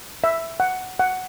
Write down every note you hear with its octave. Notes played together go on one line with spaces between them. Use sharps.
E5
F#5
F#5